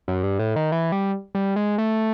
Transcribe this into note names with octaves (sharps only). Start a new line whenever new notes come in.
F#2
G2
A2
D#3
E3
G3
G3
G#3
A3